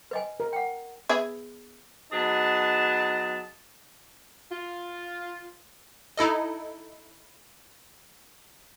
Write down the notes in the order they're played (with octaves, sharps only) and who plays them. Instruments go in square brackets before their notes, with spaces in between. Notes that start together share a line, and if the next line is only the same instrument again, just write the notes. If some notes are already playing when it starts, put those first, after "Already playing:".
[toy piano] B4 D#5 G#5
[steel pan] A#4
[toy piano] F#5 G5
[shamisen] B3 G#4 E5
[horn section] F#3 B3 D#4 G#4 A5
[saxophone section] F4
[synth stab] D#4 E4 A4 D#5